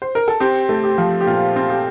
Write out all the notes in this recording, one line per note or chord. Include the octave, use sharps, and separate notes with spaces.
C5
A#4
A4
C4 G4
A3
G4
F3
G4
A#2 F4
C4
G4